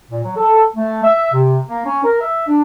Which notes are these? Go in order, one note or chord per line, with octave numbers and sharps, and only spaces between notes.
A#2
F#3
A4
A3
E5
C3
A#3
C#4
A#4
E5
D4